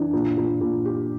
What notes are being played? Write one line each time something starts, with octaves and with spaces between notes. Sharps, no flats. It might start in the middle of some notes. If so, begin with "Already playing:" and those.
Already playing: E3 D4
A#2
A#2
A#2
G4